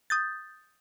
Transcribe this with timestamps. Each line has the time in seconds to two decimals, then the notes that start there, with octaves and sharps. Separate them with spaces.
0.10 D#6 G6 A6